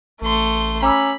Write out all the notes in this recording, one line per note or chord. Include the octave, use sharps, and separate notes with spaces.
A1 A3 C6
C#4 A#5 B5 D6 E6